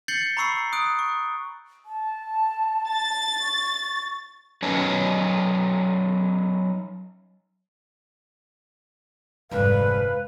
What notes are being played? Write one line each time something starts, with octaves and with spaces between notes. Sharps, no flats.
G6 A6 C7 C#7 F#7 G7
A#5 B5 C#6 E6 C7
D#6 F#6 D7
C#6
A5
A6
C#6
F#3 C#4 D#4 B4 C#5
F1 G#2 D3 F3 G3 B4 F5